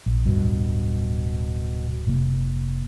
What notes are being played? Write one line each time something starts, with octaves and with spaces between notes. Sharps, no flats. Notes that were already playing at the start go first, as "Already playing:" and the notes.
A#1
D1 G#1 G2 B2
F1 C3 A#3